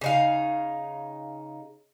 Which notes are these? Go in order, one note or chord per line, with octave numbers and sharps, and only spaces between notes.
C#3 D#4 F5